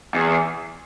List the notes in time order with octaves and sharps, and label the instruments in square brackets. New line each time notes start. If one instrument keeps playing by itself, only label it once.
[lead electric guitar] E2